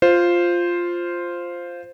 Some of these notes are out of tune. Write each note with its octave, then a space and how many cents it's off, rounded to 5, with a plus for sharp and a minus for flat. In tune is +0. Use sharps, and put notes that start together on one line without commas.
F4 +0 C5 +0